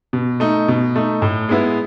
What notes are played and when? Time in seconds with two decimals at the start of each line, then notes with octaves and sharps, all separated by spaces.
0.13 B2
0.40 A3 D#4
0.68 B2
0.96 A3 D#4
1.22 A2
1.49 G#3 B3 E4